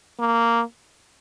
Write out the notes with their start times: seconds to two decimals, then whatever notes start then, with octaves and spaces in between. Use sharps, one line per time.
0.20 A#3